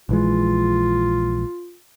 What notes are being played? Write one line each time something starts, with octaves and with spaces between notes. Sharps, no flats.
A#1 E3 G#3 F4